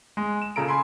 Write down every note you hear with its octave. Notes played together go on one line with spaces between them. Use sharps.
G#3
E7
A#2 C#3 A4 A#5 D7
G#5 B5 C6